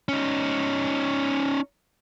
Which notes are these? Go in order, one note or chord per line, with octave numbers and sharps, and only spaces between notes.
C#4 D#4